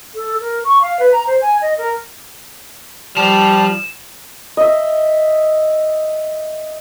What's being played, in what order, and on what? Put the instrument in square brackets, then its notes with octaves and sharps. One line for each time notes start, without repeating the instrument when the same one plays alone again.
[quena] A4
A#4
C#6
F5
B4
A#5
C5
G#5
D#5
A#4
[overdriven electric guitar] F3 [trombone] G3 [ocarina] A5 [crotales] E7
[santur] D#5 E5